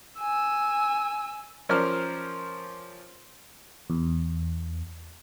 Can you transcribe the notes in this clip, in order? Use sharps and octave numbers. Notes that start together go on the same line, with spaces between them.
G#5 E6
F3 C#4 A#4 C5 D5 F6
E2